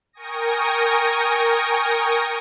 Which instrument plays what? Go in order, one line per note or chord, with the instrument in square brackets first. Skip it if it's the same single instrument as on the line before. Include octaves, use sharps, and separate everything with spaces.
[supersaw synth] A#4 G5 G#5 C#6 D#6 A#6